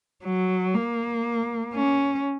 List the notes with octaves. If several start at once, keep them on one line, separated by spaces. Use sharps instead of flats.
F#3
A#3
C#4